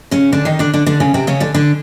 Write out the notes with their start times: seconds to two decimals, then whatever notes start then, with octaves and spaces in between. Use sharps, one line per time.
0.11 C#3 C#4
0.33 D3 D4
0.45 D#3 D#4
0.59 D3 D4
0.74 D3 D4
0.86 D3 D4
1.00 C#3 C#4
1.14 C3 C4
1.27 C#3 C#4
1.40 D3 D4
1.54 D3 D4